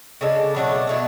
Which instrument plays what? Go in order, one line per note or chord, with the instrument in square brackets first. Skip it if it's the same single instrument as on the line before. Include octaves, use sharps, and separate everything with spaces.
[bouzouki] C#3 G#3 D4 A4
B2 F#3 A3 D4
B2 F#3 A3 D4